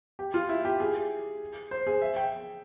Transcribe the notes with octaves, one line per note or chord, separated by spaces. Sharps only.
G4
F4
E4
G4
G#4
C5
G#4
E5
G5